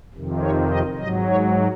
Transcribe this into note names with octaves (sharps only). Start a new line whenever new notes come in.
F2 C3 D#3
C#5
D#5
G#2 F#3 D#5
C#5